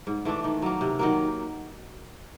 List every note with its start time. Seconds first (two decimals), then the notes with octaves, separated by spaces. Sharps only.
0.07 G#2
0.25 E3 A3 D4
0.44 D#3
0.62 F#3 A#3
0.81 C3
0.99 D#3 F#3 A#3